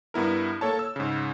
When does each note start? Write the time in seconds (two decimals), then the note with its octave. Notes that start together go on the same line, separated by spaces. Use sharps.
0.14 G2 B3 E4 A#4
0.61 A#3 A4 C#5 A5
0.79 E6
0.96 G#2 C#3